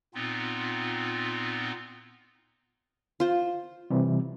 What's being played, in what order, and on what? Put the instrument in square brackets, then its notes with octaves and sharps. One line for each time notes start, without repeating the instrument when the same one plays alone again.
[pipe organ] A#2 B3 C4 D#4 F4
[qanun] F4 C5
[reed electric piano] C3 E3 G3